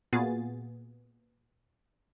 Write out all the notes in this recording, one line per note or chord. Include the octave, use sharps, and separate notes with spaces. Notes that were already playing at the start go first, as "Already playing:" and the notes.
A#2 B3 F4 F#4 G#4 A6